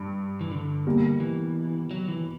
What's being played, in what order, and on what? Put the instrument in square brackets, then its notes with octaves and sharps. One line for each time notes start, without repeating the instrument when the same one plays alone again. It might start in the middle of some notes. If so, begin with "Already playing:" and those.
Already playing: [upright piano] G2
[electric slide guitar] E3
D3
[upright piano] B2 G3 A#3
[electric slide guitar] E3
F#3
E3